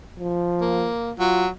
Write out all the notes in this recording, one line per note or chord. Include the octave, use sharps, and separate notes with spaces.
F3
A#3
F#3 F4